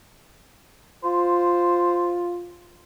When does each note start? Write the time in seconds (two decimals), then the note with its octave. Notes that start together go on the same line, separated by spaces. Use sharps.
1.04 F4 C5